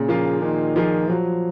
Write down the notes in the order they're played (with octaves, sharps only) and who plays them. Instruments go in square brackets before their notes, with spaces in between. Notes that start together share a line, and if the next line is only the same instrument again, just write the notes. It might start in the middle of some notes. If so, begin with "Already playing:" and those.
Already playing: [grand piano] A#2 [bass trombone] C#3
[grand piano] F3 A#3 F4 G#4
[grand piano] A#2 [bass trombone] D#3
[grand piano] F3 A#3 F4 G#4
[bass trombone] F3 [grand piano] F#3